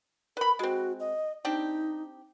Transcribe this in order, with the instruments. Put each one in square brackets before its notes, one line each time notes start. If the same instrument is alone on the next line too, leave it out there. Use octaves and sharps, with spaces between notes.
[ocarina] A#4 [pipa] B4 B5
[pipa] G#3 C4 [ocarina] F#4
[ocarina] D#5
[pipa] C4 D4 G4 [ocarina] D#4